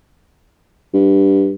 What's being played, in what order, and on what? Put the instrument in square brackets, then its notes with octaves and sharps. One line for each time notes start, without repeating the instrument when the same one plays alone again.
[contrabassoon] G2